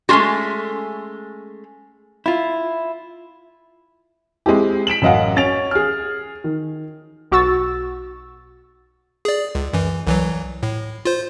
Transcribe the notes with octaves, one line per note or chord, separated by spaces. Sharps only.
G#3 A3 C#4 F4 F#4
E4 F4
G#3 C4 E4 G4
B6 D7 E7 F#7
A1 F#2 D#5 F5 F#5
C#4 A6 D7 F7
G#4 F6
D#3
B1 F#4 C#6 E6 A6
G#4 D5
C#2
F#2 E3
C2 E3 F#3
A2
F4 C5